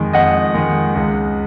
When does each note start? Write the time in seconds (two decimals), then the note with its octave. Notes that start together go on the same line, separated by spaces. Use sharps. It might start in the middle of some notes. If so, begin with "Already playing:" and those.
Already playing: F2 D#3 G#3
0.13 F2 D#5 F#5
0.54 D#3 G#3
0.95 C#2